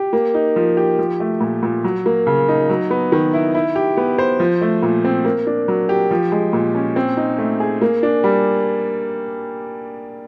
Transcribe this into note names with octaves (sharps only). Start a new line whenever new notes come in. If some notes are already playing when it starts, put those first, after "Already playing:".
Already playing: G4
A#3
D#4
F3
G4
F3
A3
A#2
A#2
F#3
A#3
C#3
D#4
F#3
B3
D#3
E4
E4
G4
B3
C5
F3
A3
A#2
C4
A#3
D4
F#3
G4
F3
G#3
A#2
C#4
C4
D#4
A3
G#4
A#3
D4
G3